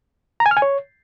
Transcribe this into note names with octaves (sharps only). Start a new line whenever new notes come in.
A#5
G#5
F6
G#5
C#5